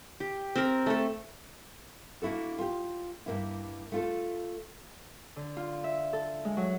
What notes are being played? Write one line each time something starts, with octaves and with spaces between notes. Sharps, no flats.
G4
C4 A#4
A3 A4
A#3 D4 E4 F#4 A4
F4 G4
G2 A#3 E4
A3 F4 A4
D3
F4
E5
A4
G#3
F#3